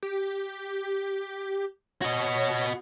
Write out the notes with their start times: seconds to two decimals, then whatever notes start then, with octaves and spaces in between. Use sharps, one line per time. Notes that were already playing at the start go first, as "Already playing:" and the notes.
0.03 G4
2.02 F#4 C#5 D#5